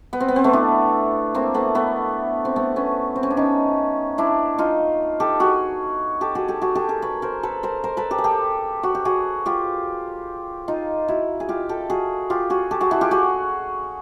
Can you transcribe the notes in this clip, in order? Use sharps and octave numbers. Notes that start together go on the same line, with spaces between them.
B3
C4
B3
C4
A3 B3
D4 E4
A#3 C4
A3 B3
A3 B3
C4
A3 B3
B3 C#4
C4
C#4
D4
C#4 D#4
D4 E4
D#4 F4
G4 A4
F#4 G#4
G4 A4
F#4 G#4
G4 A4
F#4 G#4
G4 A4
G#4 A#4
B4 C#5
A#4 C5
A4 B4
A#4 C5
A#4 C5
A4 B4
G4 A4
G#4
G4 A4
F#4
G4
F#4 G#4
F4 G4
D#4 F4
E4 F#4
G#4
F4 G4
G4 A4
F#4 G#4
F4 G4
F#4 G#4
G4 A4
F#4 G#4
E4 F#4
F4 G4
F#4 G#4